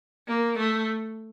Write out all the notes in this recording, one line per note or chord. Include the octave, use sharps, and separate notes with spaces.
A#3
A3